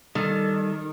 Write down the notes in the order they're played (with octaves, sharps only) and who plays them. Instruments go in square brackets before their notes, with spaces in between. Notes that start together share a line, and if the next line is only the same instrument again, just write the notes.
[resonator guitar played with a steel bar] D#3 [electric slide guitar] G3 A4